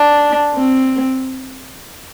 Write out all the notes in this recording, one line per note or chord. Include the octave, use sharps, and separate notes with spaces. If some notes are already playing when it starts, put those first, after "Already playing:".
Already playing: D4
C4